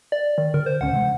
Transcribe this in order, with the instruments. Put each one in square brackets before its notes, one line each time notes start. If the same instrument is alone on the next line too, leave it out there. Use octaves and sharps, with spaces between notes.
[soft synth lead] D5
D#3
[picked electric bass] D3 [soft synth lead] A#4
[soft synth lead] C5
[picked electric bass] D1 C#2 C#4 [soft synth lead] F#5
[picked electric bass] C3 E3 G#3